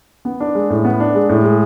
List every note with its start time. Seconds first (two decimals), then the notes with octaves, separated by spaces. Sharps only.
0.25 B3
0.40 D4
0.55 G#3
0.70 A2
0.84 B3
1.00 D4
1.15 G#3
1.29 A2
1.44 G#3